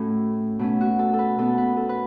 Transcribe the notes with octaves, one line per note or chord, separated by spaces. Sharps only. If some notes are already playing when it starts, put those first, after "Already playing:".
Already playing: A2 A3 C#4 F#4
B2 A3 C#4
F#4
A4
A4
B4
B2 B3 A4
B4
A4
B4